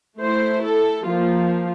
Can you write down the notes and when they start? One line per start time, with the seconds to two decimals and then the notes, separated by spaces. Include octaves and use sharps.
0.19 A3 E4 C5
0.61 A4
1.03 F3 A#3 F4